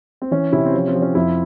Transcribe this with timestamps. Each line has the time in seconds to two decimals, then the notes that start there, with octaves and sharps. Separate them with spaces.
0.22 C4
0.31 E3 C#4
0.53 C3 E4
0.66 C4
0.74 F3 C#4
0.87 C4
0.95 F3
1.02 C#4
1.15 F2 E4